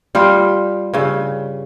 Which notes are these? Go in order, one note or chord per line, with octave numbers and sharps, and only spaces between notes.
G3 F4 G4
G2 C#3